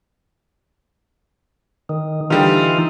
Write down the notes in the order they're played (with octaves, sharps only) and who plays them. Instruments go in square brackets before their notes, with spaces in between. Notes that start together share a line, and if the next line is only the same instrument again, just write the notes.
[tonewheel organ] D#3
[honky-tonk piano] D3 G3 [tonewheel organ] E3 D#4 F4